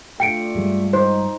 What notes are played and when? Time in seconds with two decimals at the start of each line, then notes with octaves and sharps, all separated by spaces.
0.20 A3 D4 F4 G5 C#7 D7
0.55 G2 G3 G#3
0.93 D#4 C5